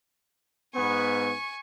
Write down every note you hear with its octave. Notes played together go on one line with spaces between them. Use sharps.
G#2 B3 G#5 C#6